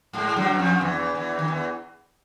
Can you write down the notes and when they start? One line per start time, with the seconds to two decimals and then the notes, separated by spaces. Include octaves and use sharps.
0.13 G#2 G#3
0.36 F#2 F#3
0.58 F2 F3
0.81 E2 E3
1.14 E2 E3
1.39 D#3
1.48 E2 E3